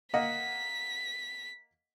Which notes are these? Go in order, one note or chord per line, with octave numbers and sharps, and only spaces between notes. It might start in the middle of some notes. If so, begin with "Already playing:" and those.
A#3 D#5 F#5 B6